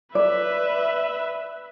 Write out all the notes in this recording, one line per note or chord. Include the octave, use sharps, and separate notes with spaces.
B4 D5 E5